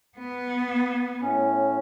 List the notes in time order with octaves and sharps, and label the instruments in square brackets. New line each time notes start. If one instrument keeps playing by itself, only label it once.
[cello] B3
[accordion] A2 C#4